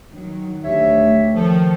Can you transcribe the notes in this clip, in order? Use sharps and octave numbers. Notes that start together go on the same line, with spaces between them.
D#3 F#3
D2 G4 C#5 E5
D#3 F3 A4